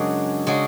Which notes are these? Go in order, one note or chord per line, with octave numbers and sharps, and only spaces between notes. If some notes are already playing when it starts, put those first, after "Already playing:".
Already playing: F#2 C#3 G#3 D4 F#4
C#3 G#3 D4 F#4